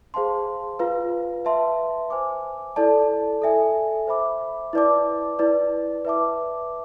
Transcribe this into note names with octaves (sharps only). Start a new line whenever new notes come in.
G#4 C5 F5 A5 C6
F4 B4 F5
B4 E5 A5 C6
C5 G#5 D6
E4 A4 D5 A5
A4 E5 G#5
C5 E5 B5 D6
E4 B4 D5 A5 D6
E4 B4 D5
B4 E5 A5 D6